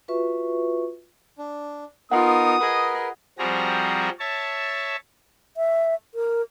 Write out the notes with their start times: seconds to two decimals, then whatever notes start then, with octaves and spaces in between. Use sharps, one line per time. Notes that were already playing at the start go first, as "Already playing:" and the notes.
0.08 F4 F#4 B4 E5 C#6
1.38 D4
2.12 B3 D#4 F4 A#4 F#5 D#6
2.60 G#4 A#4 B4 D#5
3.39 F3 G3 C4 F#4 G#4 A#5
4.20 C#5 E5 A5
5.57 E5
6.14 A#4